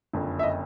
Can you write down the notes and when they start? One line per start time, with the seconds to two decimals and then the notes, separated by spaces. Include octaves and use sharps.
0.13 F#1 F2 D3
0.39 E5
0.43 D#5